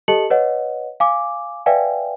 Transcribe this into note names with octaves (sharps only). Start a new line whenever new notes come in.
G4 A4 D#5 A5 C#7 F#7
B4 C#5 D#5 F#5
F5 G#5 D6
B4 D5 E5 F5 G5 G#5